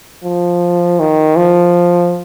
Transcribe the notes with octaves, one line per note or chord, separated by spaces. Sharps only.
F3
D#3
F3